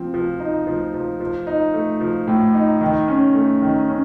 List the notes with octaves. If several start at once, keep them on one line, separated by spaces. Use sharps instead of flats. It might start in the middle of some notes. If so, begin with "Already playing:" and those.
Already playing: F3 C4
F3
D#4
F3
F3
F3
D#4
A3
F3
A2
D#4
D#3
C#4
A3
D#3
C#4